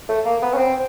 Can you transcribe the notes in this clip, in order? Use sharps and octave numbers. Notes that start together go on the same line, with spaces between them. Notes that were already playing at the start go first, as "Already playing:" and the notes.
A3
A#3
B3
C#4
C4